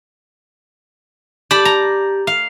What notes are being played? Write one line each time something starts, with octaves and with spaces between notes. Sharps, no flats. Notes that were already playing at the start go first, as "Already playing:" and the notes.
G4 D5 A5 B5
A#5
F5